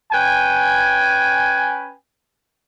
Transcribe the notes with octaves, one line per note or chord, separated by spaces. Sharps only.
C#4 B4 G5 G#5